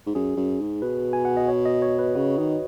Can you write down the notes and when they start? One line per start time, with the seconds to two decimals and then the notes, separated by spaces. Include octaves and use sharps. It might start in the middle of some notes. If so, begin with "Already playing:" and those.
0.06 G#2
0.15 F#2 G#4
0.37 F#2
0.60 G#2
0.82 B2 B4
1.13 G#5
1.25 F#5
1.37 D#5
1.48 C#5
1.65 D#5
1.82 C#5
1.99 B4
2.15 C#3 F#4
2.38 D#3